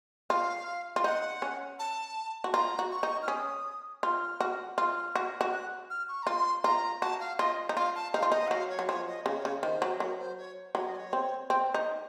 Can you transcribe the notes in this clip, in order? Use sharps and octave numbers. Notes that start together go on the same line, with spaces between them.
F4 F5
F4
D#4 F#5
C#4
A5
F#4
F4 A#5
F#4
C#6
D#4
F6
C#4 D#6
F4 F6
F#4
F4 F6
F#4
F#4
F#6
F6
C#6
A#5
F4 C6
F4 A#5
F#4 A5
F5
F4 D#5
D#4
F4 F5
A5
D#4 F5
F4
D#4 D#5
F#5
F#3 F5
C#5
F#3
F3 C#5
D#5
C#3 C#5
C#3
D#3 C5
F#3
F#3 A#4
C5
C#5
F#3 C#5
D#5
C#5
C4
C4
D#4